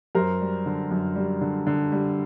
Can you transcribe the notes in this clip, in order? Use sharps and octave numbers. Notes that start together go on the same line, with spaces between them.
F#2 A#4 C5
G3
D3
F#2
G3
D3
D3
G3